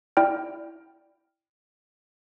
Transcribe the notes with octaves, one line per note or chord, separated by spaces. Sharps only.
E4 D5 G5 F6